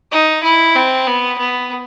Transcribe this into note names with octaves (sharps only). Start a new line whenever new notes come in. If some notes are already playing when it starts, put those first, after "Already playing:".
D#4
E4
C4
B3
B3